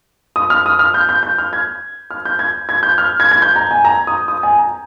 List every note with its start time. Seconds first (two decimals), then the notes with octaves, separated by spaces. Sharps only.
0.36 D#6
0.50 F6
0.66 D#6
0.79 F6
0.94 G6
1.09 G6
1.23 G6
1.38 F6
1.53 G#6
2.11 F6
2.25 G6
2.39 G#6
2.69 G#6
2.83 G6
2.98 F6
3.20 G#6
3.31 G#6
3.42 G6
3.56 A#5
3.71 G#5
3.85 A#5
4.07 D#6
4.28 D#6
4.43 G#5
4.58 A#5